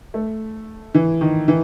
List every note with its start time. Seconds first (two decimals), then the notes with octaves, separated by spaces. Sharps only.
0.14 A3
0.94 E3
1.21 D#3
1.48 E3